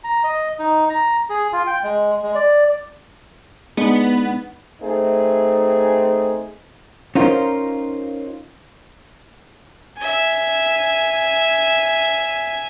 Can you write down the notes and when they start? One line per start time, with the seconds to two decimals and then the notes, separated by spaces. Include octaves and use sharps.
0.04 A#5
0.24 D#5
0.59 D#4
0.89 A#5
1.29 G#4
1.52 F4
1.67 G5
1.84 G#3
2.23 G#3
2.35 D5
3.77 G#3 B3 D4 D#4
4.82 A3 C4 D#4 G#4
7.15 C#4 D#4 F4 A#4 C5
9.97 E5 G#5